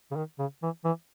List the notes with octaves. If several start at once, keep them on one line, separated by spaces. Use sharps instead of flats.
C#3
D#3
C#3
E3
E3